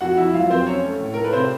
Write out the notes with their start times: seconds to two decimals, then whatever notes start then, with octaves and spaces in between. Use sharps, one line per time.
0.01 F2 F#4 F#5
0.17 F2 E4 E5
0.33 F#3 F4 F5
0.50 F2 C4 C5
0.67 C#4 C#5
0.84 A3
1.00 A2
1.14 A3 A#4
1.24 B4
1.33 C3 C4 C5